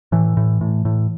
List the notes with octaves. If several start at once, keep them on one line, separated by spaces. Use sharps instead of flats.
A2 E3
A2
A2
A2